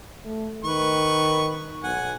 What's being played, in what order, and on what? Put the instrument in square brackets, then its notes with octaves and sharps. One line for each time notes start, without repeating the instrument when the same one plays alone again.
[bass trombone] A3
[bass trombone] D#3 [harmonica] B4 C#6
[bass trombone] B1 [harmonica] F#5 G#5